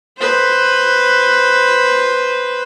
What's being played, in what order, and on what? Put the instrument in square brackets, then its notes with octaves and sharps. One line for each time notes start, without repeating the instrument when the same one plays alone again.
[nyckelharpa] B4 C5